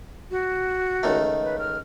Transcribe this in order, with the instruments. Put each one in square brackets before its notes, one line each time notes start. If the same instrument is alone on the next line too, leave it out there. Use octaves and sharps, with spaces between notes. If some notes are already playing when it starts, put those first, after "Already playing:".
[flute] F#4
[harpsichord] C#2 D#3 A3
[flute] B4
F6